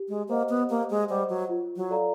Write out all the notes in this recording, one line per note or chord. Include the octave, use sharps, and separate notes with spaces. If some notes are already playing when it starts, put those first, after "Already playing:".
Already playing: G4
G#3
A#3 C5 D#5 F#5
B3
A#3 G4
G#3
G3 C5 D#5 F#5
F#3
F4
F#3
A4 D5 F5 A#5